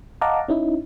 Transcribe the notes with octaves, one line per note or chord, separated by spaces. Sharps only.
D#5 F5 F#5 A5 A#5 D6
C#4 D#4 E4